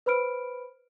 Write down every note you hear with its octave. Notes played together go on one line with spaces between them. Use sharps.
B4 C5 B5 F6 D7